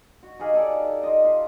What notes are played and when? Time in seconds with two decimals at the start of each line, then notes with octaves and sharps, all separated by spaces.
0.23 F#4
0.39 D#4 G4 G#4 F5
0.54 D#4 A4 D5
1.03 F4 D#5
1.24 F4 E5